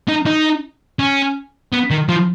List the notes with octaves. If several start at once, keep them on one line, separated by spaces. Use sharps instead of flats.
D#4
D#4
C#4
B3
D#3
F3